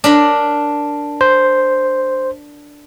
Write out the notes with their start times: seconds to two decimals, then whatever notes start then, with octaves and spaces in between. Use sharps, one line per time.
0.04 D4 A#4 B5
1.21 C5